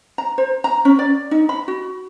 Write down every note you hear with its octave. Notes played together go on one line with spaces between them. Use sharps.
A#5
C5
A#5
C#4
D5
D#4
B5
F#4